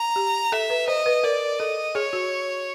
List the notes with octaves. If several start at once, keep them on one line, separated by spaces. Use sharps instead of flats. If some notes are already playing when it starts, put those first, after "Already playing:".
Already playing: A#5
G4
A4 E5
B4
C5 D#5
B4
A#4 D5
A4 D#5
G#4 C#5
F#4